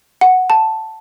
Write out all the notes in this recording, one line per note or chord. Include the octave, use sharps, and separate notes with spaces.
F#5
A5